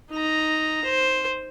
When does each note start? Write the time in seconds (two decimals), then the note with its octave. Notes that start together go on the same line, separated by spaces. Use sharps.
0.11 D#4 A#5
0.84 C5